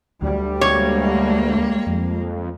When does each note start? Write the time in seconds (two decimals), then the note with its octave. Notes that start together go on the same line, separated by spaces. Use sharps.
0.22 D2 G3
0.61 G#3 A#3 C#5
1.87 F2